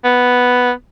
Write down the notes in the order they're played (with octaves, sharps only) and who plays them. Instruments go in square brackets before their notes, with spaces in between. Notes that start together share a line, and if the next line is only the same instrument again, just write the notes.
[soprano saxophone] B3